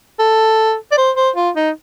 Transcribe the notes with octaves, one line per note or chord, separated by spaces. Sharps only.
A4
D5
C5
C5
F4
D#4